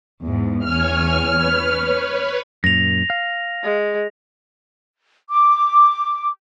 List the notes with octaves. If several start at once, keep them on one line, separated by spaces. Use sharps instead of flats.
E2 G#2
E2 C#5 G#5 F6
B4 C#5
F#2 A#2 A#6 F7
F5
G#3
D6